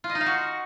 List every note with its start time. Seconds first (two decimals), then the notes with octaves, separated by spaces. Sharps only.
0.04 F4
0.10 D#5
0.15 D#4
0.21 F5
0.26 F#4